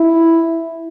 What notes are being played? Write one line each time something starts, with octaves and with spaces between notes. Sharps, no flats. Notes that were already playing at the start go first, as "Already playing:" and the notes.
Already playing: E4